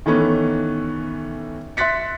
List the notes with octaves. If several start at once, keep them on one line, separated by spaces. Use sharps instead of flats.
D#3 E3 A3 B3 C#4
E5 C6 F#6 A6 B6 C#7